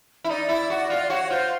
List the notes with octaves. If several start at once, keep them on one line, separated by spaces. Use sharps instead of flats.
E4
D#4 D5
E4
F#4
F4
D5
F#4 C#5
C#5
F4 C5